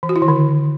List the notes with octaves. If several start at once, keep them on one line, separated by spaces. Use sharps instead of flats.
E3
F#4
E4
D#3
D3